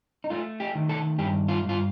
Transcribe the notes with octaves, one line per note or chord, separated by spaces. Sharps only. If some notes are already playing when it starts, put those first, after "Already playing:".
D#4
A3 F4
G4
D#3
A4
G2 G4
F4
G2
F4